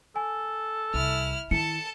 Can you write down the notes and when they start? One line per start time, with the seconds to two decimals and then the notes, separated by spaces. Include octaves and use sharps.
0.16 A4 G#5
0.94 C2 E4 F6
1.51 D#3 E4 A4 A5 C#7